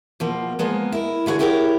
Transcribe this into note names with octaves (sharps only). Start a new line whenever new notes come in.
B2 F3 A#3
F3 G#3 A#3 B3
E4 A#4
D3 E4 F#4 G#4 C#5
E4 F#4 G4 A#4 C5 C#5